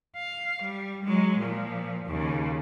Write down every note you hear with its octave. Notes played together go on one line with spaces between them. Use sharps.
F5
G3
F#3 G#3
A#2 F3
D#2 C#3